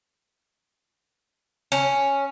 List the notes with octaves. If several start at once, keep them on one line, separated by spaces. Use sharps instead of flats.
C#4